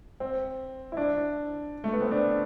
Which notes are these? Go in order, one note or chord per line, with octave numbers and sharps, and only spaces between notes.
C4
E4
D4
A3
B3
C4
D4